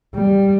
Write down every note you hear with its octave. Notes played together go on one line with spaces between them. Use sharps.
G3